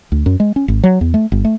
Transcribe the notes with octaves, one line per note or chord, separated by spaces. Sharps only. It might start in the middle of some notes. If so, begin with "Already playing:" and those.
D2
F#2
G#3
C#4
G#1
F#3
E2
A3
G1
A3